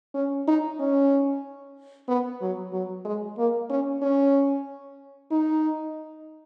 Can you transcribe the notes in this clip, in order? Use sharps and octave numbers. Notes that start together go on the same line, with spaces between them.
C#4
D#4
C#4
B3
F#3
F#3
G#3
A#3
C#4
C#4
D#4